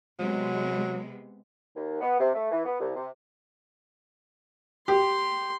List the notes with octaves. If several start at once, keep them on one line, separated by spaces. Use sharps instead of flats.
C3 F#3 G#3 B3
D#2
B3
C3
A3
E3
B3
C2
C3
G4 C6